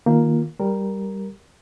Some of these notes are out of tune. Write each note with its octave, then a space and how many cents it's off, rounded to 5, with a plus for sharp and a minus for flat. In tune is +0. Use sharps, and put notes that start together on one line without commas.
D#3 +0 A#3 +0 F4 +0
G3 +0 A#4 +0